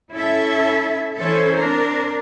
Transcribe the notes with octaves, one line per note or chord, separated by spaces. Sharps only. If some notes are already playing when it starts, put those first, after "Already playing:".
C#4 E4 A4 E5
E3 C#4 E4 A4 C5
C4 D4 A#4